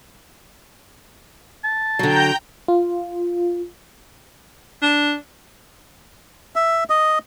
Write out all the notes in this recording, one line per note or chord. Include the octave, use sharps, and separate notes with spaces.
A5
D3 F#3 G5 A#5 G6
F4
D4
E5
D#5